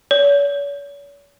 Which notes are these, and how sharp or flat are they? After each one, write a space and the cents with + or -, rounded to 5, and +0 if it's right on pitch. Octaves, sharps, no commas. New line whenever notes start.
C#5 +40